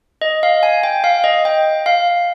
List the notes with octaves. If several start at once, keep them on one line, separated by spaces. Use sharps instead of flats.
D#5
F5
G#5
G5
F5
D#5
G5
F5